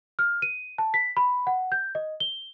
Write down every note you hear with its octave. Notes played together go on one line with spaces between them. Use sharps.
F6
D#7
A5
B6
B5
F#5
G6
D#5
G7